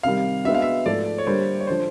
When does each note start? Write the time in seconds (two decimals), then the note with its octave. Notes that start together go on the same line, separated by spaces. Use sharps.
0.03 C3 D#3 G3 F5
0.44 G#3 B3 D4 F#4 E5
0.54 F5
0.62 E5
0.86 G#2 F3 A3 D5
1.18 C#5
1.27 D3 G3 A#3 C5
1.61 C#5
1.67 D3 F3 C5